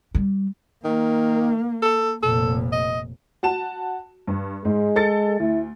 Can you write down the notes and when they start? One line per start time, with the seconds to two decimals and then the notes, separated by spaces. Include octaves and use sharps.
0.15 G3
0.84 D#3 A#3
1.82 A4
2.23 F1 A#2 A4
2.72 D#5
3.43 F#4 A5 E7
4.27 G2
4.65 G#2 G#3
4.96 A4 A6 C#7
5.40 D2 E4